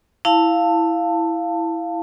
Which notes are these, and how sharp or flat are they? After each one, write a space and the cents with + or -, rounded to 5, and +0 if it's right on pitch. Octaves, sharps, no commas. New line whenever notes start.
E4 +0 F5 +0 A5 +15